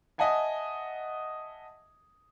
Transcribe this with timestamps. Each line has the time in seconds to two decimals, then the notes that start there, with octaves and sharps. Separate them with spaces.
0.18 D#5 E5 F#5 G#5 A5